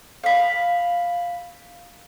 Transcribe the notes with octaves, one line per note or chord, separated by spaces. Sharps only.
F5 B5